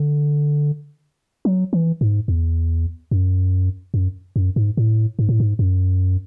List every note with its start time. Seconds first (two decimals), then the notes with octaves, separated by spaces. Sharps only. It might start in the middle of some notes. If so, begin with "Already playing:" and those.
Already playing: D3
1.45 F#3
1.73 E3
2.01 G#2
2.28 E2
3.11 F#2
3.94 F#2
4.36 F#2
4.56 G#2
4.77 A2
5.19 G#2
5.29 A2
5.40 G#2
5.59 F#2